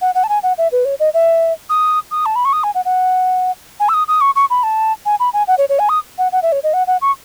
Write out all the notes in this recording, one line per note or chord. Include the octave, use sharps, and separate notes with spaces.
F#5
F#5
A5
G#5
F#5
E5
B4
C#5
D#5
E5
D#6
D#6
A5
B5
C#6
D#6
G#5
F#5
F#5
G#5
E6
D#6
D#6
C#6
C#6
B5
A5
G#5
B5
G#5
F#5
C#5
C#5
G#5
D#6
F#5
F#5
E5
C#5
D#5
F#5
F#5
C#6